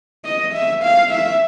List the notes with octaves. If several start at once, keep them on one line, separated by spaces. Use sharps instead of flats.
D#5
E5
F5
E5